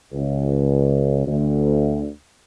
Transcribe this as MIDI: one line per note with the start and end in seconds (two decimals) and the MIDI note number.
0.12 1.24 37
1.27 2.09 38